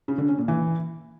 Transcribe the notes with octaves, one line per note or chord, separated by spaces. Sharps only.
C#3
D3
C#4
A#2
E3